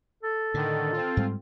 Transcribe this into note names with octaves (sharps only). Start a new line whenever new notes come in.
A4
A2 D3 D#3
C4 F4
G#2 G3 G#3